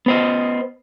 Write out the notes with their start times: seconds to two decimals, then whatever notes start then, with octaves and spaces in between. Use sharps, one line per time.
0.06 B3 C5 D#5